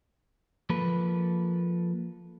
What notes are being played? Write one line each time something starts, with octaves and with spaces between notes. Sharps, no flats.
F3 A#3 A4 B4